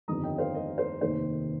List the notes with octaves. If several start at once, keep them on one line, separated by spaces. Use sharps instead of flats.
G1 F2 D#3 G3 A#5 D#6
D#5 G5
C5 F5
A#4 D#5
C5
F1 D#2 D#3 A#3 C5